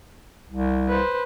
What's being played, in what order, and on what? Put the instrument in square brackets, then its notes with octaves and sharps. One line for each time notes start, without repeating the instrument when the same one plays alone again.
[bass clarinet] C2
[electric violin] B4 C5